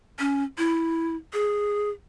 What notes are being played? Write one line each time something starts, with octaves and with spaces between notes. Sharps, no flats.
C#4
E4
G#4